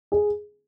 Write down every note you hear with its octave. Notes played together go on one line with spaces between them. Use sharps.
G#4